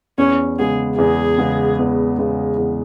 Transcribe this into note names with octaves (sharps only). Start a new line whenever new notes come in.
E2 C#4
C#3 G#3 B3 G#4
E2 G#4
C#3 G#3 B3
E2
C#3 G#3 B3
E2